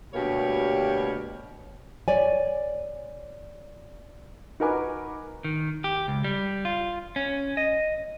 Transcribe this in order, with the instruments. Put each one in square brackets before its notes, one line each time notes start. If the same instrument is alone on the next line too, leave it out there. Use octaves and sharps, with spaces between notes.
[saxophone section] D2 B2 G3 A#3 G4 C#5
[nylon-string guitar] C#5 D5 G#5
[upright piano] D#4 F#4 A#4 B4 G#5 D6
[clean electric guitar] D#3
G4
C#2
G3
F4
C#4
D#5